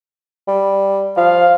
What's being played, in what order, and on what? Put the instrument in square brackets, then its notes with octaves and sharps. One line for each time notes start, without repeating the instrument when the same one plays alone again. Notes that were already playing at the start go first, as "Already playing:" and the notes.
[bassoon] G3
[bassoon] F3 [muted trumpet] F5